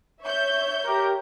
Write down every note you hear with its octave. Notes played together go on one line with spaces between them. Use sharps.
C#5 E5 G6
G4 A#4